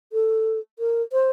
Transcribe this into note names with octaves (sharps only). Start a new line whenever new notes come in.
A4
A#4
C5